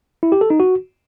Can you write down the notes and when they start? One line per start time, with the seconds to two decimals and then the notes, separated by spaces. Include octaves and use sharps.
0.23 E4
0.32 G4
0.41 A4
0.50 D#4
0.60 F#4